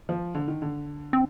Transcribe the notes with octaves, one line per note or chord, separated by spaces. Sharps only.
F3
D3
D#3
D3
C4